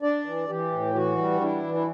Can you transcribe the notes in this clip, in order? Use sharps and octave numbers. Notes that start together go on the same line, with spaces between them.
D4 D5
E3
E3 G4
A2
E3 F#4
G3
D4 E4
E3
E4